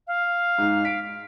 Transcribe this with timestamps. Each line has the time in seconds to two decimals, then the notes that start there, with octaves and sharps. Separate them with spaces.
0.07 F5
0.58 G#2 D#4
0.85 B6 D7